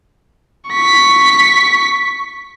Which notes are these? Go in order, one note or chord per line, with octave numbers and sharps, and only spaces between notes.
C#6 B6